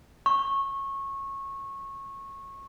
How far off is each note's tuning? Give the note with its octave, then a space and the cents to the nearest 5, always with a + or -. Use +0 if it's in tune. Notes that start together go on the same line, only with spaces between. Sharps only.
C#6 -20